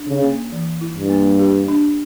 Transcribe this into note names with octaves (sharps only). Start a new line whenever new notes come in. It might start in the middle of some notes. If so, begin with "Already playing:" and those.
Already playing: D4
C#3
A#3
E3
E4
G2
A#3
G4
D4